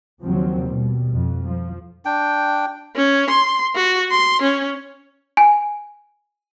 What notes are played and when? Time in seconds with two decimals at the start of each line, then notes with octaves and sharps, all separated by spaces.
0.23 D#2 C#3 F3 F#3 C4
0.68 B2 G3
1.13 F2
1.47 F3
2.05 D4 G5
2.96 C#4
3.30 C6
3.75 F#4
4.11 C6
4.42 C#4
5.37 G#5